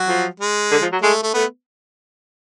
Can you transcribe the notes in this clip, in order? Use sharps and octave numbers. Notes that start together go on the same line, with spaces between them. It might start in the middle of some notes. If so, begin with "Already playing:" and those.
Already playing: F#3 F#4
F3
G#3
D3
F3
F#3
G#3 A3
A3
A3 B3